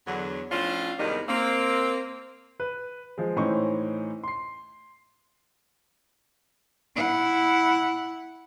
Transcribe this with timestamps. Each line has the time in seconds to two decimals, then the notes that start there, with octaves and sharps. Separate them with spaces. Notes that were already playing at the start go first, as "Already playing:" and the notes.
0.06 E2 D3 F#3
0.52 A2 F3 C#4 D4 F4
0.99 E2 C3 D#3 G3 G#3 D#4
1.29 A#3 C4
2.60 B4
3.18 F3 G#3
3.37 A2 E3 C#4 D#4 C5 C#6
4.24 C6 C7
6.95 E4 F#5